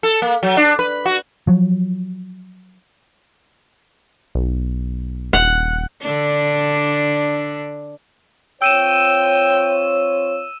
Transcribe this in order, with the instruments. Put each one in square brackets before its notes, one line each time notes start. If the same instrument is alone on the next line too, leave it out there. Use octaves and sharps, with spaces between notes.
[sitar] A4
A#3
F#3
D4
B4
F#4
[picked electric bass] F3 F#3
[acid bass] B1
[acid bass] D#1 [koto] F#5
[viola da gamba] D3 D4
[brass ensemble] C4 F4 C#5 [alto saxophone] G5 [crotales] E6 D#7 E7